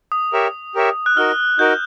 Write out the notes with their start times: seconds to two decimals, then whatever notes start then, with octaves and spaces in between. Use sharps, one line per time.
0.12 D#6
0.33 G4 A#4 C#5 E5
0.75 G4 A#4 C#5 E5
1.06 F#6
1.17 D#4 F#4 A#4 F6
1.59 D#4 F#4 A#4 G6